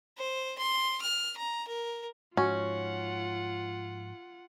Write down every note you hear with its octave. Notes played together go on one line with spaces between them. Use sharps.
C5
C6
F6
A#5
A#4
G#2 F3 C#4 F4 F#4 F#5